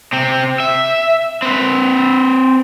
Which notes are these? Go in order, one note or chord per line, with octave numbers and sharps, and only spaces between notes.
C3 C4
E5
C4 B4